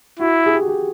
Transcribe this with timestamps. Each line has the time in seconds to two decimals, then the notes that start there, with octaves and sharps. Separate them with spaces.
0.20 E4 F#4
0.46 G#4
0.54 G4
0.61 F#4
0.68 G4